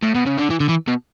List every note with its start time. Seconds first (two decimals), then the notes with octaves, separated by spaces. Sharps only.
0.03 A2
0.15 B2
0.26 C#3
0.38 D3
0.50 E3
0.60 D3
0.69 E3
0.88 B2